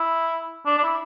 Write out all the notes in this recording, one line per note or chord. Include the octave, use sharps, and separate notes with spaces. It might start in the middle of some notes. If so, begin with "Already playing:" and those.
Already playing: E4
D4
D4
E4